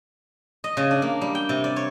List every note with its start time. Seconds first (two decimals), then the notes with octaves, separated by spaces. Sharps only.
0.64 D#5
0.77 C#3
0.91 D4
1.02 A#3
1.21 G3
1.35 G5
1.49 C3
1.64 D5
1.76 C#5